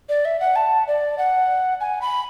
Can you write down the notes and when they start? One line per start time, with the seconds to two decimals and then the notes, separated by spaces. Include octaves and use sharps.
0.09 D5
0.25 E5
0.40 F#5
0.56 A5
0.87 D5
1.18 F#5
1.81 G#5
2.01 B5